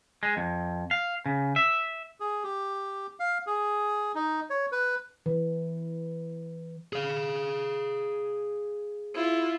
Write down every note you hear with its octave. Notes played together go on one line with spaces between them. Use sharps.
G#3
F2
F5
C#3
E5
G#4
G4
F5
G#4
D#4
C#5
B4
E3 B4
G#4 F5
E4 F4